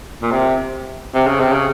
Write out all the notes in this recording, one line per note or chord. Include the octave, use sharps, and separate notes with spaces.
A#2
C3
C3
C#3
C3
C#3